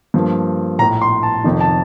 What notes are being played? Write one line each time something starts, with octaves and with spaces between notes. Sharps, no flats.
G2 F3 A#3
A#1 A2 A3 A#5
C6
A5
F1 F2 D#3
A5